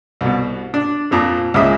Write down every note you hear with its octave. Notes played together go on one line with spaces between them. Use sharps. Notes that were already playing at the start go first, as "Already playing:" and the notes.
C2 B2
D4
F2 A#2 F3
C#2 A#2 G#3 E5 D#6